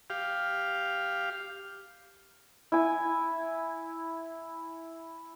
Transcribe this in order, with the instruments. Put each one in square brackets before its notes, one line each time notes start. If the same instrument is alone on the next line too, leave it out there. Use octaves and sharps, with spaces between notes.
[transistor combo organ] G4 F5
[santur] E4 G#5